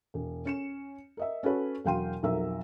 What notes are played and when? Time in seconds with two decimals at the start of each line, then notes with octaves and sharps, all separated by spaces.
0.14 E1
0.45 C#4 C#7 E7
1.17 A#4 D#5 E5
1.43 C#4 F#4 A4 B4 C#5
1.85 E1 F#3 F5 G5 C6 D#7
2.23 B1 F2 F#3 A#4 E5 E6